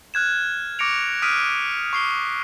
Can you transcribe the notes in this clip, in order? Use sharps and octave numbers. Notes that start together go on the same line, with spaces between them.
F6 F#6 G#6 E7
C#6 D6 A#6 C#7 D7 F7
D#6 F6 F#6 B6 D7 D#7
C#6 C7 G7